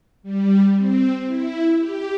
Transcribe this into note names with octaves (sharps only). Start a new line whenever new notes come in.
G3
C4
E4
G4